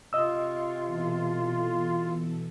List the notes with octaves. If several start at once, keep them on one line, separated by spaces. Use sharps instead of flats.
C3 F4 D#5 F5 G5 C#6 E6
B2 E3 A4